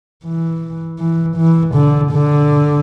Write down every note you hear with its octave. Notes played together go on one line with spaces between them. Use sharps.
E3
E3
E3
D3
D3